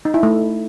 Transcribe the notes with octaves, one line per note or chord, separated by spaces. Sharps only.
D#4
E4
A3